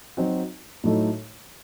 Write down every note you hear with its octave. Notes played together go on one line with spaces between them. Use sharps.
F#3 C4 D#4 F#4
A2 F#3 A3 D#4